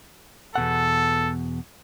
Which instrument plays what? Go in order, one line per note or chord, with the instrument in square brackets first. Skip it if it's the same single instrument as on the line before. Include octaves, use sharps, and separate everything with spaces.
[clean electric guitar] E2 B2 F#5 [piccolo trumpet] A4